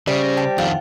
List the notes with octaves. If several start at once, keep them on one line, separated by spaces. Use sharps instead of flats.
C#3 G3 C5
C5 A#6
G4 G5 A5 A6
F2 D#3 F4 F#5